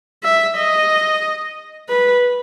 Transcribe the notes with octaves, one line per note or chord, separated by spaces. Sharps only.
E5
D#5
B4